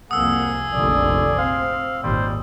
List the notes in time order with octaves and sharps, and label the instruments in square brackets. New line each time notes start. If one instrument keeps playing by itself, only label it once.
[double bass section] C2 F2 A#3 [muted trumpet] G#4 [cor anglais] F#5 [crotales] D#6 E6
[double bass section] F1 A#1 D3 [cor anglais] D5
[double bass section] C4 [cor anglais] F5
[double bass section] G#1 D#2 A#2 [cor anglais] G3 [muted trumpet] C5